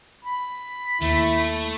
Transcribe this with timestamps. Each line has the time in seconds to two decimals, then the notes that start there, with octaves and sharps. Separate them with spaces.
0.25 B5
1.01 D#2 A3 E4